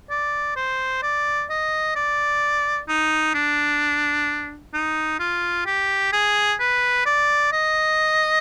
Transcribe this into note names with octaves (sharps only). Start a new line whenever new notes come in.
D5
C5
D5
D#5
D5
D#4
D4
D#4
F4
G4
G#4
B4
D5
D#5